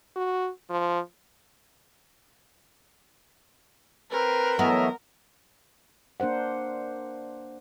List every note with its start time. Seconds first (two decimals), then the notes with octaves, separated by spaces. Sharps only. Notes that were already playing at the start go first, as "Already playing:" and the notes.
0.16 F#4
0.70 F3
4.12 C4 A#4 B4
4.59 E3 F#3 A3 B3 C#5 D#5 E5
6.20 A#3 D4 A#4 C5 F#5